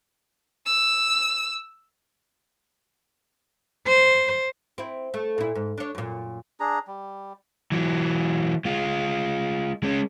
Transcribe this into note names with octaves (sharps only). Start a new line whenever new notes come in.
E6
C5
C4 E4
A3
A#2 E4
G#2
D4 C#5
F#2 A#2
D4 G#4 A#5
G3
E3 F#3
G#3 F4
G#3 C#4